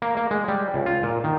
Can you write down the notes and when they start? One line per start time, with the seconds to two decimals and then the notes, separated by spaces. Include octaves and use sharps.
0.02 A#3
0.17 A#3
0.31 G#3
0.48 G3
0.74 C#2
0.86 F4
1.03 A#2
1.24 D#3